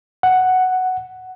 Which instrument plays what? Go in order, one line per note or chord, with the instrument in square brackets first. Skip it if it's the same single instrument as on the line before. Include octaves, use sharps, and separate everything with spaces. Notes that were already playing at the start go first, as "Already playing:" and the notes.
[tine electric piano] F#5